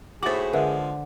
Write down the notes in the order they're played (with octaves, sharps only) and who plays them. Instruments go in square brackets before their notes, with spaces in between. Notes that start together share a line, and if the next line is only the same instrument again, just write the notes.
[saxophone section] D#2 A2 F#4 [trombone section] G#4 [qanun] C5 B5 [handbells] D6 A6
[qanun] D3 [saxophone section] F3 G#3 [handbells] A#4 B4 E5